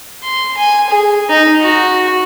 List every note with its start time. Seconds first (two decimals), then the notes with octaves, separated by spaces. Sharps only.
0.24 C6
0.57 G#5
0.90 G#4
1.30 D#4
1.61 F#4